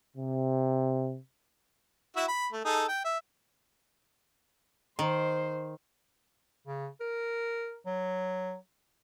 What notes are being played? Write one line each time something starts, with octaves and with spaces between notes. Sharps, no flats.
C3
E4 F#4 E5
B5
A3
D#4 G#4 A4
G5
E5
D#3 C5
C#3
A#4
F#3